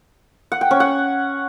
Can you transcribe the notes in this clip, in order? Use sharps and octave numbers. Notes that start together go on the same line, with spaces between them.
F#5
G5
C#4
F#5